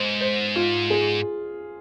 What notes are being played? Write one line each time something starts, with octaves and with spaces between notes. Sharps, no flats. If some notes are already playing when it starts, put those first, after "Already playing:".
Already playing: G#2 C5
C5
F4
G#4